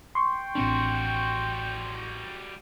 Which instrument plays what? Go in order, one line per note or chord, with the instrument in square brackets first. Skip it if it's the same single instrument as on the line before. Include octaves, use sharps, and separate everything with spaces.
[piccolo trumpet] G5 [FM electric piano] C6 C#6
[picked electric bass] A1 C4 D4 [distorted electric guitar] G3 F#4